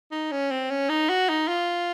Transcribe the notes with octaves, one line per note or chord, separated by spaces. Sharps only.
D#4
C#4
C4
C#4
D#4
F#4
D#4
F4